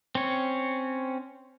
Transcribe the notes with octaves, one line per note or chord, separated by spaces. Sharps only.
C4 C#4 C#5